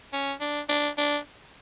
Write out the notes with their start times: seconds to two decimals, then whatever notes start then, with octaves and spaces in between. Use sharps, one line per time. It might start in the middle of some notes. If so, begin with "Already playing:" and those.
0.13 C#4
0.40 D4
0.69 D4
0.98 D4